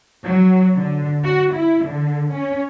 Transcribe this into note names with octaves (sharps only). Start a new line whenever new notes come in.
F#3
D3
F#4
E4
D3
C#4